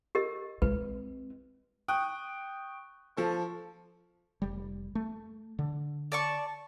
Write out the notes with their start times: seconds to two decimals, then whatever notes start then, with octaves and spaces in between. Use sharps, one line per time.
0.15 G4 A#4 D#5
0.62 G#3 C4 B4
1.88 G5 C#6 D#6 F#6
3.17 F3 A4 C#6
4.42 F1 G3
4.95 A3
5.59 D3
6.12 D5 A5 C#6